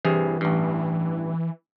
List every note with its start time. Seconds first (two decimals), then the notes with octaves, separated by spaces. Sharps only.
0.05 G2 C3 E3 G#4
0.41 A1 G2